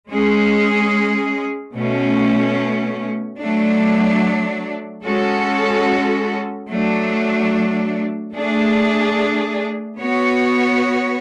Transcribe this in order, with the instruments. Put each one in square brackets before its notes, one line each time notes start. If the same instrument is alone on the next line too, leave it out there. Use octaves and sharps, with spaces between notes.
[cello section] G#3 C#4 G#4
B2 A3 C#4
F#3 A3 D4
G#3 C#4 F#4 A4
F#3 A3 D4
A3 D4 G#4
B3 F#4 C#5